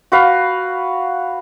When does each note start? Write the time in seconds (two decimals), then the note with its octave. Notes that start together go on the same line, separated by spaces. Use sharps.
0.12 F#4 B4 F5